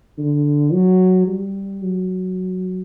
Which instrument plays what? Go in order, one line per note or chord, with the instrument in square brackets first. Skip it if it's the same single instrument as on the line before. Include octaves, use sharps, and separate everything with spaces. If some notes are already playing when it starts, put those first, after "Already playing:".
[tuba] D3
F#3
G3
F#3